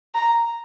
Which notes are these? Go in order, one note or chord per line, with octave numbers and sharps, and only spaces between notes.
A#5